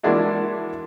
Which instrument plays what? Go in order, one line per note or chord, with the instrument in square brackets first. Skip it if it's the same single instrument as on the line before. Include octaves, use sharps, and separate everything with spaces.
[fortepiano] E3 G#3 A#3 D4 E4 F#4